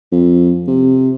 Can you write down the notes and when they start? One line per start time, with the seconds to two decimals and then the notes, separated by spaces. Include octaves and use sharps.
0.12 F2
0.67 C3